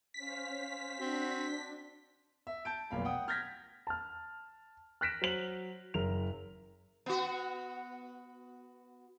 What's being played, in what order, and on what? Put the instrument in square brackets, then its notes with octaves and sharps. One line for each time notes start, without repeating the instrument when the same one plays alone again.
[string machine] C#4 C5 F5 [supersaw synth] B6
[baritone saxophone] C4 [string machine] D4 [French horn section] F#4
[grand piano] E5
A5 G6 D7
F1 B1 A#2 F5 B5
F#5 G5 D#6
F6 G6 G#6 A#6 B6
[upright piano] A5 F6
F6 F#6 A#6 B6 D7 E7
F#3 C5 F#7
F#1 A#4 F7
[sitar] B3 F#4